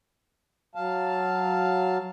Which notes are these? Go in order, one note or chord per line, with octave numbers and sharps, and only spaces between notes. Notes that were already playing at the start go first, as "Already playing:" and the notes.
F#3 F5 A5